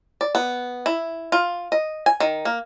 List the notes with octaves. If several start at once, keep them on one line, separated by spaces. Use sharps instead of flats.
D5
B3
E4
F4
D#5
G#5
D#3
A#3